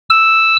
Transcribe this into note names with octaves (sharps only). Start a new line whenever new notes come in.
E6